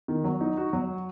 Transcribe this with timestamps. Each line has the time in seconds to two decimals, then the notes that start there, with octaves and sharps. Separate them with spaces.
0.08 D#3
0.24 F#3
0.41 D#4
0.57 F#4
0.73 F#3